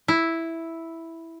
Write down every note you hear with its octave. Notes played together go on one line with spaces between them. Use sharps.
E4